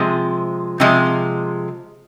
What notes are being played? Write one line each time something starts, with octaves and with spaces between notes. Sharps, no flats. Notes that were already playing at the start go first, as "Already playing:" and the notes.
Already playing: C3 F3 G#3
C3 F3 G#3